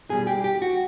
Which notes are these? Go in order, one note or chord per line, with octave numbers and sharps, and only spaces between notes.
B2 G3 G#4
G4
G4
F#4